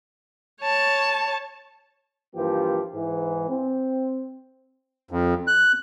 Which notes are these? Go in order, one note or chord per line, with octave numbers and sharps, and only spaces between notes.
C#5 A5
G2 E3 F3 A#3 G4
G#2 E3
C4
F2
F#6